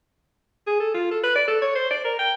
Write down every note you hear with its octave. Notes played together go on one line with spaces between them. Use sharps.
G#4
A4
F4
A4
B4
D5
A4
C#5
C5
D5
A#4
G5